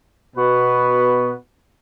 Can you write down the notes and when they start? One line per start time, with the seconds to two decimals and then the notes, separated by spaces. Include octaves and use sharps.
0.35 B2 B3 F#4 B4